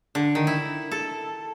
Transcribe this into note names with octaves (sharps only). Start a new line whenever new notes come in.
D3
D#3
E4
A4